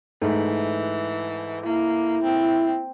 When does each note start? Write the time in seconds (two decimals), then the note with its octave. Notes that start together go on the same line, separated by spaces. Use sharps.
0.22 G#2 E3 A3
1.66 A#3 E4
2.23 C4